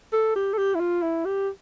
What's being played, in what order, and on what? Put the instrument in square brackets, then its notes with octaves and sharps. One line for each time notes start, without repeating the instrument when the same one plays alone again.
[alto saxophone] A4
G4
A4
G4
E4
F4
E4
G4